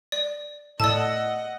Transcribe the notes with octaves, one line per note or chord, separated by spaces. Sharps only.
D5
A2 D5 D#5 F#5 A5 E6